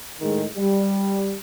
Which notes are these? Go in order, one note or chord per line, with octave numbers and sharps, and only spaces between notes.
A2 D#3 G#3
G3